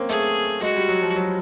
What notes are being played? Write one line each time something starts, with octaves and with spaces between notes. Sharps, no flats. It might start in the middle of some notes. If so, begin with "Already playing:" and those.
Already playing: A#3 C4 C#4
A3 G#4
G#3 F#4
G3
F#3
F3
F#3